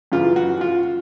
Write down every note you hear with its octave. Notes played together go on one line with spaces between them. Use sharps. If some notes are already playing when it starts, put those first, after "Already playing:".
F#2 C#3 E3 F4
F#4
F4